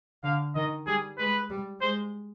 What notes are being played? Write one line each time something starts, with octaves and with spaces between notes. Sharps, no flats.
D3 F5
D#3 D#5
G3 G#4
G#3 B4
G3
G#3 C5